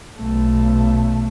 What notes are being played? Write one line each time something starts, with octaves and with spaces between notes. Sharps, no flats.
B1 A3